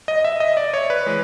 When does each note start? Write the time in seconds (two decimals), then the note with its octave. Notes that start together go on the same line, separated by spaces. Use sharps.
0.08 D#5
0.24 E5
0.40 D#5
0.57 D5
0.74 C#5
0.90 B4
1.06 E3 G#3